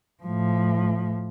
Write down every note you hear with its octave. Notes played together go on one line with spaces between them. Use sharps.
A2 F3